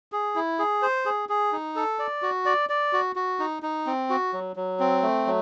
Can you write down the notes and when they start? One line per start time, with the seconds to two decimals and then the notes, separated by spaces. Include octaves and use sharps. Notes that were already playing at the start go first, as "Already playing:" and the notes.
0.12 G#4
0.36 E4
0.59 G#4
0.82 C5
1.05 G#4
1.29 G#4
1.52 D#4
1.76 A4
1.99 D5
2.22 F#4
2.46 D5
2.69 D5
2.93 F#4
3.16 F#4
3.39 D#4
3.63 D#4
3.86 C4
4.10 F#4
4.33 F#3
4.56 F#3
4.80 C4
5.03 A3
5.27 F#3